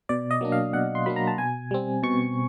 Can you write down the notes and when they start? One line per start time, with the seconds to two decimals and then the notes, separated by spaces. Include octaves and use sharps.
0.09 B2 D5
0.31 D#5
0.41 F#3 A#3 D4
0.52 F5
0.73 B2 F#5
0.95 C6
1.06 F#3 A#3 D4 B5
1.16 A#5
1.27 A5
1.38 B2 G#5
1.71 G3 C4
2.03 B2 C#6